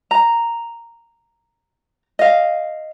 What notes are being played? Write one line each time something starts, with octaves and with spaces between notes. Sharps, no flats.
A#5
D#5 F5